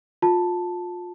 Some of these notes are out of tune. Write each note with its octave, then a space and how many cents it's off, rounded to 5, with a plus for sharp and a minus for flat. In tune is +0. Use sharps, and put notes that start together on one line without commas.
F4 +30 A5 +0